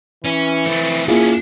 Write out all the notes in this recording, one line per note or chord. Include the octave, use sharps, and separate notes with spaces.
E3 C#4
A3 C4
A#3 C#4 D4 E4 F4 G#4